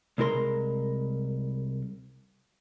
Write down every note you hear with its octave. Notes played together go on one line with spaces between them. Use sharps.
C2 G#3 E4 A#4 C6